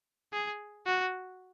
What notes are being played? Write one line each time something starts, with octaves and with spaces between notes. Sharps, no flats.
G#4
F#4